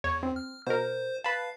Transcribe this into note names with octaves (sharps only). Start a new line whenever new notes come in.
E2 C#5
C4
F6
B2 A#4 C5
B4 F5 A5